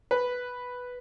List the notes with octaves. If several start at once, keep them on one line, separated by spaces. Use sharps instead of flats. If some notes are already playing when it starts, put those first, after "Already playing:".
B4